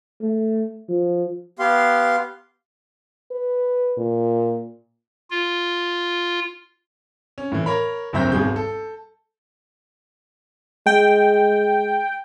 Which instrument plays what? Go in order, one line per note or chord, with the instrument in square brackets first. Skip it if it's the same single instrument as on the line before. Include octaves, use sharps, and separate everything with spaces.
[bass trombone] A3
F3
[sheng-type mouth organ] B3 G4 F5 C6
[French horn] B4
A#2
[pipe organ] F4
[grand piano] C#4
A2 E3
A#4 C#5 B5
F#1 D2 C4 E5 A#5 G6
D#1 G#1 B2 G#3 G#4 G6
A4
[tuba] G#3 [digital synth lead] G5